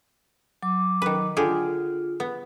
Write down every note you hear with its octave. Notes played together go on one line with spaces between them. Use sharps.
F#3 D6
D#3 B4
D3 F4 G4 G#4
B3